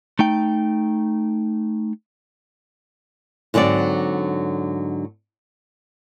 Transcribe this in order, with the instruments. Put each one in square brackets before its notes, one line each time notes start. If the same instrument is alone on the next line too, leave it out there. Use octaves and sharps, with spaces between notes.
[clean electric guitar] A3 D#4 G5
[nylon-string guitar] G#2 D3 F#3 C4 D5